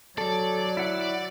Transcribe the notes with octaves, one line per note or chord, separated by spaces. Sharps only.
F#3 A4 D5
E4 F#5